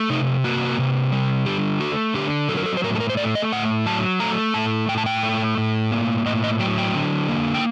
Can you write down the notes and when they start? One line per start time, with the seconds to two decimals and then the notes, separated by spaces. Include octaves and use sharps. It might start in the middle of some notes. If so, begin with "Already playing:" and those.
Already playing: A3
0.10 C3 D#4
0.44 A#3 F#4
0.78 C3
1.12 G3
1.46 D3 G4
1.80 A3 F#4
2.14 D3 G4
2.49 F#3 A4
2.57 A#4
2.66 A4
2.77 C5
2.84 A2 A#4
2.95 A4
3.00 A#4
3.10 C5
3.17 A3 D5
3.35 D#5
3.52 A2 F#5
3.86 F#3 A5
4.20 A3 A#5
4.54 A2 A5
4.89 A2 G5
4.98 A5
5.06 G5
5.23 A3
5.58 A2
5.92 A#3
6.26 A2 D#5
6.44 D#5
6.60 F#3 G5
6.78 G5
6.94 D3
7.29 A#3
7.54 G5